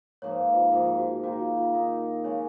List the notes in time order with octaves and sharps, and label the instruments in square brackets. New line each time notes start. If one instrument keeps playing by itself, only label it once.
[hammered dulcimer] G#2 F3 A#3 [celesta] C#5
[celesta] B4
F4
[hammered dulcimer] G#2 F3 A#3 [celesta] F4
[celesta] F4
F#4
[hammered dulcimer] D#3 A#3 D#4 [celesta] F#4
[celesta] F4
F4
[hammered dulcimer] D#3 A#3 D#4
[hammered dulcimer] C#3 G#3 C#4 [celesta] C#5